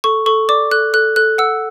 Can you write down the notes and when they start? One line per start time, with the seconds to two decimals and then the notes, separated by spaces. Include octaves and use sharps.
0.04 A4 C#6
0.26 A4 C#6
0.49 D5 D6
0.71 A4 F#6
0.94 A4 F#6
1.16 A4 F#6
1.38 F#5 E6